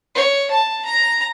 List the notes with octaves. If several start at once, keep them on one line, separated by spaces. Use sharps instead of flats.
C#5
A5
A#5